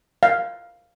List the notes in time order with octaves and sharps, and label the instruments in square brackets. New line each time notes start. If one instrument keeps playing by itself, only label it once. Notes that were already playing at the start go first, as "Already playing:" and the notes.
[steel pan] F5